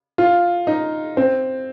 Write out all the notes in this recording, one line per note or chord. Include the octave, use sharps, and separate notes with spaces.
F4
D#4
C4